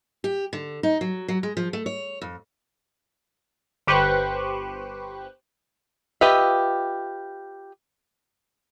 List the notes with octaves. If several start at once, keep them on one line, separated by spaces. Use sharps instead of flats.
G4
D3
D#4
F#3
F#3
G#3
F3
A3
C#5
F2
G1 G4 B4 C5 C#6 F#6
F4 G4 B4 D#5 E5